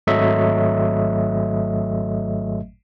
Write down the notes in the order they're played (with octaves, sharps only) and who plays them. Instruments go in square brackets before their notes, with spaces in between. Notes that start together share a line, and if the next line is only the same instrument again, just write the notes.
[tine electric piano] G#1 F#3 A3 D#5 E5